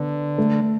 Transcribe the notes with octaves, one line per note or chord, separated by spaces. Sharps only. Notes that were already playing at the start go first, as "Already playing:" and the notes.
Already playing: D3 B3
A3